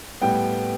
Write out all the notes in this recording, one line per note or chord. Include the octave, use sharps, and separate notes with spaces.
A2 G3 B3 G5